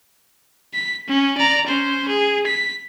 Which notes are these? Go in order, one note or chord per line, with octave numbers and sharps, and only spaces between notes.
B6
C#4
D5 A#5
C#4 C5
G#4
B6